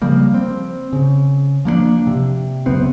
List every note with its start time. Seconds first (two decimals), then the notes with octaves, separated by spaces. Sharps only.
0.02 C#3 F3 G3 A#3
0.34 C4
0.93 C#3
1.65 F3 A#3 B3 D4
2.07 C3
2.66 C#2 F#2 B3 C4